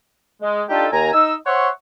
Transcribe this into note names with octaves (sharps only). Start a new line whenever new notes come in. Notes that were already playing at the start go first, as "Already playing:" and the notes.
G#3
D4 D#4 F4 G4 A4
D#2 G#5 A#5
D#4 E6
C5 C#5 E5 F#5 C6 C#6